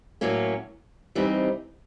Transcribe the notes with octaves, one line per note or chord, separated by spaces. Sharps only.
A2 F#3 A#3 C#4 F#4
C3 E3 G3 C4 D#4